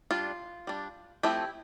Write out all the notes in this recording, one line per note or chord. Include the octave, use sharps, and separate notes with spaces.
G3 D4 F4
G3 D4
F3 A3 C4 E4 G4